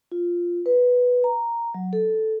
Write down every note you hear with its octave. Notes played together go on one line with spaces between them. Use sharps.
F4
B4
A#5
F#3
A4